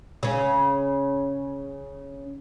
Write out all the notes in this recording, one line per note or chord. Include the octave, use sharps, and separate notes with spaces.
C#3 C#4